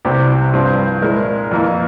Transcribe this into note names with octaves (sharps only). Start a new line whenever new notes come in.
C2 C3 G3 C4 G4
G2 F3 C4
A#2 G#3 E4 A#4
F2 E3 A#3